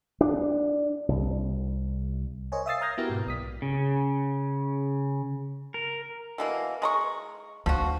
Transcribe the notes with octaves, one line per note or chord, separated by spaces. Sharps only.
D4
C2
A#4 C5 C#5 D#5 G#5
E5 F5 D#6 E6 A6 C7
A#5 D#6 F6 G6 G#6 A#6
B3 E4 F#4 G4 A#4
G#2 B2
B1 D#6 B6
C#3
A#4
B2 E3 A#3
G#3 A#5 C#6
D2 F3 F#4